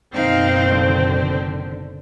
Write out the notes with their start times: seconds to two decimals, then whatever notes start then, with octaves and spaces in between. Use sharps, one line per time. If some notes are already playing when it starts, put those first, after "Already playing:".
0.14 F#1 B2 D#3 C4 D#4 F5
0.72 D3